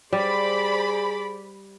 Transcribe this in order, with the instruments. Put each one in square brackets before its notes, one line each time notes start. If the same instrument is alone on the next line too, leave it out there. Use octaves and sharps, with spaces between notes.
[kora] G3 [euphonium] G#4 [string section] C5 D5 B5